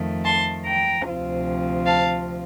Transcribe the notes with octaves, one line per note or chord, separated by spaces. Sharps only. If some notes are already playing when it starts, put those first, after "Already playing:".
Already playing: F2 D#3 A3
A5 C6
G5 A#5
D2 C3 F3 C4 F4
F5 A5